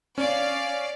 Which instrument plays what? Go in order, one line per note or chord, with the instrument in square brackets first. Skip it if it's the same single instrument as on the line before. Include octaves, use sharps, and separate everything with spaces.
[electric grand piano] C#4 [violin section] D5 F5